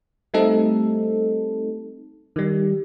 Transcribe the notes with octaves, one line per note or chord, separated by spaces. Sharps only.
G3 A3 C4 D#4 A4
D#3 G3